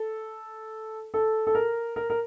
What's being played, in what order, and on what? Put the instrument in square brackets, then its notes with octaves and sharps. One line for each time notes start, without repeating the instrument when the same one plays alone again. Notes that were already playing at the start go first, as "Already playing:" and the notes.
Already playing: [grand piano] A4
A4
A4
A#4
A#4
A#4